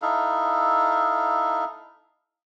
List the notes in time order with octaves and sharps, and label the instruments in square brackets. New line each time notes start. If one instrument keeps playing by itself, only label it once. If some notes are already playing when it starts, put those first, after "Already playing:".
[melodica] D#4 E4 A4 F5